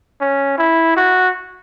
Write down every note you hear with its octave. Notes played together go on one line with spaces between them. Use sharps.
C#4
E4
F#4